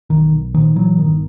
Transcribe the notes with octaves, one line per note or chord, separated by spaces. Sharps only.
B1 D#3
B1
A#2 D#3 F3
A#2 E3 F#3
G1 D#3